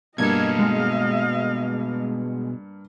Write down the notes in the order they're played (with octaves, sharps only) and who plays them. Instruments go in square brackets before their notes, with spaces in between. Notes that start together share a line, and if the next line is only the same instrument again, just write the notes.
[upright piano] G2 A#3 [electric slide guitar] B2 A4 [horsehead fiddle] D#5 F5 [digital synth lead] G#6
[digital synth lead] G#3